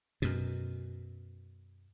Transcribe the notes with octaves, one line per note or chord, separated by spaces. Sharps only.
F#2 B2